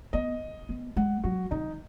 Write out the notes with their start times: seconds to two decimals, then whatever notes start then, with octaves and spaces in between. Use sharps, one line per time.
0.13 B3 D#5
0.69 B3
0.96 G#3 F#5
1.24 F#3 F#4
1.51 D#3 D#4